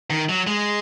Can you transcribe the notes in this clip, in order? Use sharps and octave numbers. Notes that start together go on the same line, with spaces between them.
D#3
F#3
G#3